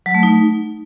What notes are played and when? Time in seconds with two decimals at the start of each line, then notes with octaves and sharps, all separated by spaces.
0.06 F#3
0.14 A3
0.23 D#4